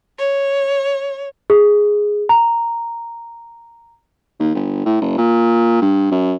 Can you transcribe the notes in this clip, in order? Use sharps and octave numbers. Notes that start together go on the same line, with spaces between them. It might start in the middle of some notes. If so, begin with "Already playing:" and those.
C#5
G#4
A#5
D#2
G1
A2
F#1
A#2
G2
F#2